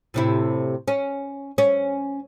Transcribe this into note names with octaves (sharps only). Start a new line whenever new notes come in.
A2 C3 E4
C#4
C#4